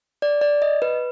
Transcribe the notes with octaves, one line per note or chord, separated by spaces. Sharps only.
D5
D5
D#5
B4